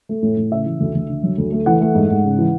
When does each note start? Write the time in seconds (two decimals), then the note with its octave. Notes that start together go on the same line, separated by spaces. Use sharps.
0.09 A3
0.23 A2
0.37 A2
0.51 C#3 E5
0.66 E3
0.80 D2
0.95 D2
1.09 D3
1.23 F#3
1.38 D2
1.52 A3
1.66 E3 F#5
1.81 A3
1.95 G#2
2.09 G#2
2.24 C#3
2.38 E3